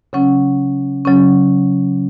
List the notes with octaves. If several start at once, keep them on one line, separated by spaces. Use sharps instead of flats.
C#3 F#3 C#4 F#5
C#3 F#3 C#4